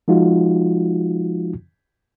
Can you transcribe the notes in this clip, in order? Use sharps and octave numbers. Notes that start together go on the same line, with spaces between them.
F3 G#3 D#4 F4 F#4